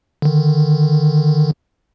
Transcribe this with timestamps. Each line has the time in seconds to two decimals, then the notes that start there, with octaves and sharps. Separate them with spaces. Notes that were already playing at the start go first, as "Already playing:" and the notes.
0.22 D3 D#3